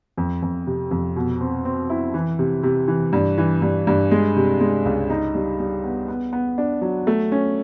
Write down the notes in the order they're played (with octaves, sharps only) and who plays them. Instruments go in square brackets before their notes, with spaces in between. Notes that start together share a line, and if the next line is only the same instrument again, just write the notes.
[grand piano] F2
F2
C3
F2
B2
C4
C4
E4
E3
C3
C3
E3
G2
E3
G2
G2
G#3
C3
G#3
C#2
D#4
G3
G3
B3
B3
B3
D4
F#3
A3
C#4